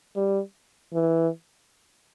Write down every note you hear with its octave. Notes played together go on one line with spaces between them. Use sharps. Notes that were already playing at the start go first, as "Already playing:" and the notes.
G3
E3